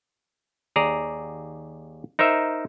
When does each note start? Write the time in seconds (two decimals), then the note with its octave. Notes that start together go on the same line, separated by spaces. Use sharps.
0.76 D#2 G#4 D5 A#5
2.19 D#4 A#4 C5 E5